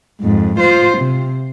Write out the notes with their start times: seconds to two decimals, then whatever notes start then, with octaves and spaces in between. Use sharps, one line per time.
0.21 F2 G#2
0.59 F4 C5
0.98 C3